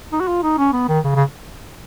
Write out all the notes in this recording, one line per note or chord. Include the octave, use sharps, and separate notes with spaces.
D#4
F#4
F4
D#4
C#4
B3
D#3
C#3
C#3